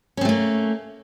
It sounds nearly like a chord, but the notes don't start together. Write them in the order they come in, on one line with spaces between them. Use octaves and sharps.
C#4 C4 A3 A#3